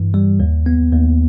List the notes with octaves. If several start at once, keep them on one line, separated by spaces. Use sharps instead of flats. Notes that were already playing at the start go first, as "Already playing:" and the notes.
Already playing: G2 E3
G3
D#2
B3
D#2